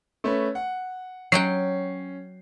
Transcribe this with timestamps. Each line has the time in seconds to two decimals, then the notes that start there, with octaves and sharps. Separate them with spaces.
0.24 A3 C#4 B4
0.55 F#5
1.32 F#3 C#4 F#5 G5 C7